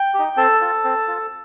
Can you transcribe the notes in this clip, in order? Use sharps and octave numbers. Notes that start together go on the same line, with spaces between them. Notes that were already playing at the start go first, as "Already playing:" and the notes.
Already playing: G5
G4
D#4
C4 A4 A5
F4
C4
F4